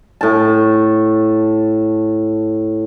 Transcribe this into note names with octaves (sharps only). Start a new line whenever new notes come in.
A2 A5